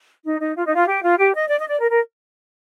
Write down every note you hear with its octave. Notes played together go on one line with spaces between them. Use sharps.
D#4
D#4
F4
D#4
F4
G4
F4
G4
D#5
D5
D#5
D5
A#4
A#4